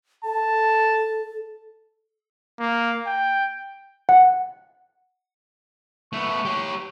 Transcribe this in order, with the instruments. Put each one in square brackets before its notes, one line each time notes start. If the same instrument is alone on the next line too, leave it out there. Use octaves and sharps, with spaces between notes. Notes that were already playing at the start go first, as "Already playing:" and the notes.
[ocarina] A4 [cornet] A5
[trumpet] A#3
G5
[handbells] F#5
[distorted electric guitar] A3 B3 [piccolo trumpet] C#6
[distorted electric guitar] G4 C#5